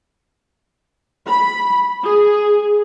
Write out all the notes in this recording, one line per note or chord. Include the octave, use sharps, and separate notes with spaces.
B5
G#4